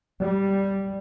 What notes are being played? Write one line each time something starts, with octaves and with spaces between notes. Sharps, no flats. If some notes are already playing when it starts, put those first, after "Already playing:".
G3